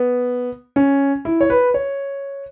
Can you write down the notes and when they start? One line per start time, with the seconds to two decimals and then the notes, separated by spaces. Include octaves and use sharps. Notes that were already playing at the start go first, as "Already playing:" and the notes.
Already playing: B3
0.76 C#4
1.25 E4
1.41 C#5
1.50 B4
1.74 C#5